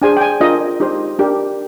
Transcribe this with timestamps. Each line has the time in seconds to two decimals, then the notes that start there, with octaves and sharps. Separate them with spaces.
0.02 D4 G#4 C5 G#5
0.17 G5
0.21 G#5
0.40 D4 F4 A#4 D#5
0.80 D#4 G4 C5
1.19 D4 G4 A#4